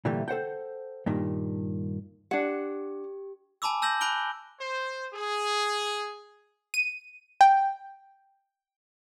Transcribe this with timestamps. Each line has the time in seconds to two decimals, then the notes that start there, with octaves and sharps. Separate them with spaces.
0.05 A#2 D3 E3 G3 A3
0.28 A4 C5 F#5 G5
1.06 G2 A#2 D#3
2.31 D4 G4 F#5
3.62 G#5 A5 B5 D6 E6
3.82 A5 E6 G6 A#6 F#7
4.01 G#5 B5 F#6 D7 F#7 G7
4.60 C5
5.13 G#4
6.74 D#7
7.41 G5